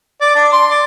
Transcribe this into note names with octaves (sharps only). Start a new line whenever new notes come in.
D5
D4
C6
D5